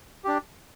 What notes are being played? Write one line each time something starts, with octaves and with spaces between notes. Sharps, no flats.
D4 G4